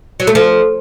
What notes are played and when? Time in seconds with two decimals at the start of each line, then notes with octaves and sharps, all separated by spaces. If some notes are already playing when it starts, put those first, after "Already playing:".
0.20 F#3
0.27 A3
0.35 F3